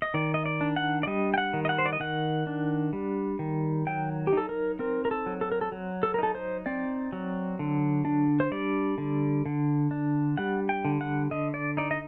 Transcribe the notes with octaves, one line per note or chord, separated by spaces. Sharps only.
D#5
D#3 D5
D#5
D5
D4
F#5
D5
G3 D#5
G5
F#5
D#3
D#5
F#5
C5
D5
D#5
D#3 F#5
D4
G3
D#3
F#3 G5
G4
D#4 A4
A#4
C4 A#4
A#4
A4
F#3
A4
A#4
A4
F#3
A4
A#4
D#4 A4
C5
C4 D5
F#3
D3
D4
C5
G3 D5
D3
D3
D4
G3 F#5
G5
D3
F#5
D3 D#5
D5
D#4 D5
D#5